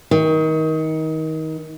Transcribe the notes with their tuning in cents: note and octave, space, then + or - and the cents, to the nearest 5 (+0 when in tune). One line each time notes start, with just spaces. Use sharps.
D#3 +25